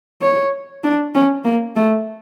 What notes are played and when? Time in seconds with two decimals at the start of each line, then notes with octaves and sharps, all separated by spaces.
0.22 C#5
0.84 D4
1.14 C#4
1.44 A#3
1.76 A3